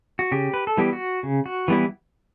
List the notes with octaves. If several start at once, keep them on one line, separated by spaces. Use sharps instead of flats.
F#4
C#3 G4
B4
A4
E3 G3 B3 E4 G4
F#4
C#3
F#4
E3 G3 B3 E4